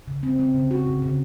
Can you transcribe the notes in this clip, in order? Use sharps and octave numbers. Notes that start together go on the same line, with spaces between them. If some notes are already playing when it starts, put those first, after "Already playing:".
C#3
C4
C4
C#3
F#4
C#3
C#3